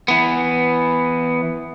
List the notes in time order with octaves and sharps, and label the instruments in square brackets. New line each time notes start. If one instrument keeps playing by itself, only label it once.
[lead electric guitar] E3 B3